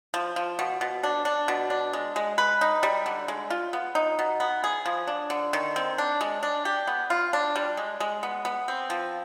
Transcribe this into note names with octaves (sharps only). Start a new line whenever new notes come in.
F3
F3
B2
B2
D4
D4
B2
D4
G#3
G#3
B4
D#4
G3
D3
G#3
F4
B3
D#4
B2
B3
G#4
F3
D4
D3
D#3
C4
D4
G#3
D4
G4
B3
F4
D4
G3
G#3
G#3
B3
B3
C4
F3